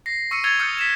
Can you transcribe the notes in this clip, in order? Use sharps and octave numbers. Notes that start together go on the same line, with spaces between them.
A#6 C7
C#6 E6 C#7 D#7
E6 G#6 A6 C#7 F7 G7
D#6 F6 G6 A6 C#7
B6 E7